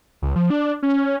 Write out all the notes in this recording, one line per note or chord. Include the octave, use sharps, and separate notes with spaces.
C#2
F3
D4
C#4